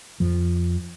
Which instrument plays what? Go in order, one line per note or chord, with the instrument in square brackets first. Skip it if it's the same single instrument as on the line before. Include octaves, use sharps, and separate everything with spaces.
[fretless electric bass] F2 F3